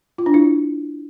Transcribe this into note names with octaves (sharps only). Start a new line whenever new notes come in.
F4
D4
E4